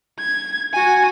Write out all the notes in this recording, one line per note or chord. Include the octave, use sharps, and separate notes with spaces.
G#6
F#4 G#5